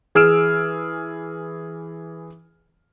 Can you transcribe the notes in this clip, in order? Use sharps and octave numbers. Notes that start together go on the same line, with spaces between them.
E3 G#4 E6 F6 D7 E7